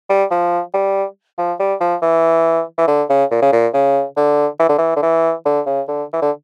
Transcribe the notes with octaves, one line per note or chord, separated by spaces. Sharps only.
G3
F3
G3
F3
G3
F3
E3
E3
D3
C#3
A#2
C#3
A#2
C#3
D3
E3
D3
E3
D3
E3
D3
C#3
D3
E3
D3